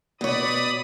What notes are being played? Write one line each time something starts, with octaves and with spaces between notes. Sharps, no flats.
B2 C#5 D5 B5 D#6